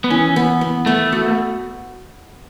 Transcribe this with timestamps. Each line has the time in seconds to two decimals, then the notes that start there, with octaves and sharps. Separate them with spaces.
0.04 B3
0.10 E3 C#4
0.36 B3
0.61 B3
0.86 A3 B3
1.12 F#4